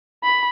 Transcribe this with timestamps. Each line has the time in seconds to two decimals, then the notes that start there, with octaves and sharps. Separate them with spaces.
0.23 B5